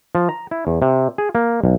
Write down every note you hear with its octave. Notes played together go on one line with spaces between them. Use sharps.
F3
A#5
E4
E2
C3
G#4
A#3
B1